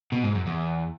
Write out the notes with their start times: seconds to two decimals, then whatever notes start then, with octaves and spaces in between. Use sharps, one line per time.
0.12 B2
0.24 G#2
0.35 F#2
0.46 E2